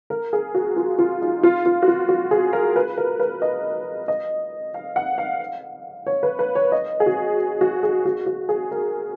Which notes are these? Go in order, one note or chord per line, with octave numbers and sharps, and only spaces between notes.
A#4
G#4
F#4
F4
F4
D#4
F4
F4
F#4
F4
F#4
G#4
A#4
B4
A#4
B4
D#5
D#5
F5
F#5
F5
C#5
B4
B4
C#5
D#5
G#4
F#4
F#4
G#4
F#4
F#4
G#4
A#4